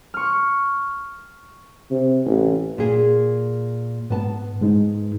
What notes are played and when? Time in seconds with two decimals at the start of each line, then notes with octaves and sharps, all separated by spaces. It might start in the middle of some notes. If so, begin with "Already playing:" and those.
0.14 C#6 F6
1.91 C3
2.26 A1
2.78 A#2 G#4
4.10 G#2 B3 A5
4.61 G#2 G#3 D#4